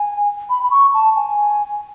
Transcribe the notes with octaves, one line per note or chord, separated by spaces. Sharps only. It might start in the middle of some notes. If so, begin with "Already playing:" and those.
Already playing: G#5
B5
B5
C#6
A5
G#5